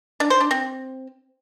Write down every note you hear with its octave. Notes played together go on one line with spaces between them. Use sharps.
D4
C5
D4
C4